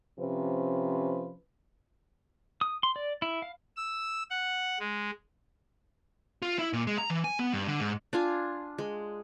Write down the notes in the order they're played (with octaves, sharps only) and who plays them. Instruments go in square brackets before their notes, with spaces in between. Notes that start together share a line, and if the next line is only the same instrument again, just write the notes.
[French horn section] C3 F3 C#4 B4
[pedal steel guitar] D#6
C6
D5
E4
F5
[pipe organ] E6
F#5
G#3
[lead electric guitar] F4
E4
A#2
G#3
A#5
E3
G#5
B3
G2
D3
G#2
[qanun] D4 F4 G#5
G#3